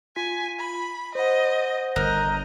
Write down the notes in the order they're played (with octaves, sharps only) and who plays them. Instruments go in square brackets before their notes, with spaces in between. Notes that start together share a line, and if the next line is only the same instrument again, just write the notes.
[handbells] F4 B6 [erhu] G#5
[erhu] B5
[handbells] C5 F#5 [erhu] D#5
[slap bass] G1 [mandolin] A#4 [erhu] D#5 [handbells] F#6 G6